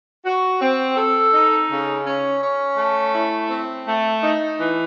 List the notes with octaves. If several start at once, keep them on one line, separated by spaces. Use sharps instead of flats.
F#4
C4
A4
D#4
C#3
C#4
C#4
A3
E4
C4
A3
D#4
E3